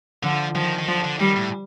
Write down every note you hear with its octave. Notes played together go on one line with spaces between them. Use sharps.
D3 F3
D#3 F3
D#3
D3 F3
D3
D#3 G3
A2